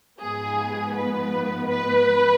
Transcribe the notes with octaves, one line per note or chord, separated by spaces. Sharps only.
G#2 F3 B3 G#4
B4
B4